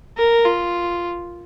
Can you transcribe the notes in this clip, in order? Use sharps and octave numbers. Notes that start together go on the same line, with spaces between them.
A#4
F4